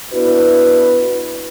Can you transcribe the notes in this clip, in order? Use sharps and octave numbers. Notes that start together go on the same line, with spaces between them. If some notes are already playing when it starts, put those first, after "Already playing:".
B3 D4 E4 F#4 B4